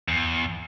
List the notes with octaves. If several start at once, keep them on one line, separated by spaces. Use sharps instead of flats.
E2